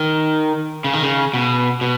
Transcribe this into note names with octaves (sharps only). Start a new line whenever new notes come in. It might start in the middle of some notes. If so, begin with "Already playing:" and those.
Already playing: D#3
C#3
D#3
C#3
B2
B2